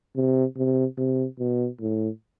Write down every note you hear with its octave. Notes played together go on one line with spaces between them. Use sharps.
C3
C3
C3
B2
A2